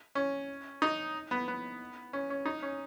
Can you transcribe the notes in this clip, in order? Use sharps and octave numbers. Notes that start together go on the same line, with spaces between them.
C#4
D#4
B3
B3
C#4
C#4
D#4
C#4